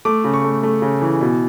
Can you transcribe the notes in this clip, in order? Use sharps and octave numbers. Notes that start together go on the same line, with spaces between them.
A3 D6
C#3
C#6
A3
A3
C#3
E3
B2